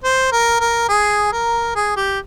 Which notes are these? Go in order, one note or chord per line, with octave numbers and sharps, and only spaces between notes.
C5
A#4
A#4
G#4
A#4
G#4
G4